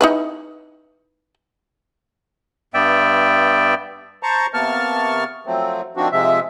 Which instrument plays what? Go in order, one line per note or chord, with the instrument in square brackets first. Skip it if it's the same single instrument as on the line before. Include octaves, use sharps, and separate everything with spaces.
[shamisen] D#4 E4 B4
[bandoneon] G2 B3 D5 E5 G5
[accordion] C5 A5 A#5 C#6
C3 A#3 B3 A5 C#6 F6
F3 F#3 A3 C4
D#3 F3 C4 D4 F#4
C3 F3 G#3 E5